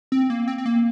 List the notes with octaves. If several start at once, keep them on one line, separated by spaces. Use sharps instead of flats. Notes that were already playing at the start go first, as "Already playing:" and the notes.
C4
A#3
C4
C4
A#3